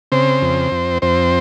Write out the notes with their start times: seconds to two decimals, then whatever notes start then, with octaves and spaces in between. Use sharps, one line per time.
0.12 C#3 C4 C5
0.42 F2
0.71 F2
1.02 F2 C4 C5